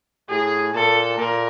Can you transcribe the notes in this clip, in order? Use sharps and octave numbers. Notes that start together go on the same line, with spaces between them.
A2 G#4
A#2 A4
A#2 A#4